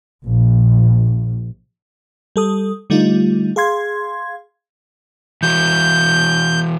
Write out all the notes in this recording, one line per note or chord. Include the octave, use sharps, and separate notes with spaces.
A#1
G3 A4 D#6
D3 G3 A3 D#4 F4
G#4 F5 C6 G#6
E3 F#4 G6